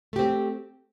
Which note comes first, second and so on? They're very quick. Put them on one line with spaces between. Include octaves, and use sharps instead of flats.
A3 G4 C4